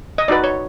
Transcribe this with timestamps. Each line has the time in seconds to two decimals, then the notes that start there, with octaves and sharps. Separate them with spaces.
0.18 D#5
0.28 D#4 F#4 B4 D5
0.44 C#5